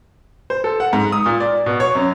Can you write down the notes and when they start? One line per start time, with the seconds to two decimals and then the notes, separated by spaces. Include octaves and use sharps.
0.50 C5
0.64 A4
0.80 F#5
0.93 G#2
1.12 D#6
1.26 A#2
1.40 D5
1.66 B2
1.80 C#5
1.95 F#2